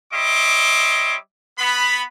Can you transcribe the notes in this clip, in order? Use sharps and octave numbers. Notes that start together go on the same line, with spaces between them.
G3 C#5 D#5 E5 C6 D6
B3 B5